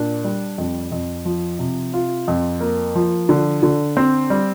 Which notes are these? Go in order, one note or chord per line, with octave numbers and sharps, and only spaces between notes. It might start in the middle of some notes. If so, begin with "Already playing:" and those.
Already playing: A#2 D4
G3
F2
F2
F3
C3
F4
F2
A#3
F3
D3
D3
C4
G3